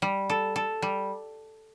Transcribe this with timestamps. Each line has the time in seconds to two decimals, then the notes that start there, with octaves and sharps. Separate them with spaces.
0.02 G3
0.30 A4
0.56 A4
0.82 G3